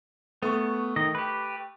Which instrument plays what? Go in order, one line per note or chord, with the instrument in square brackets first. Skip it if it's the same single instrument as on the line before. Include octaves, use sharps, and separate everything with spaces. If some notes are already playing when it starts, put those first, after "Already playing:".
[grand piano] A3 C#6 [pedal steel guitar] B3
[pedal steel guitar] D#3 D#5
G4 B4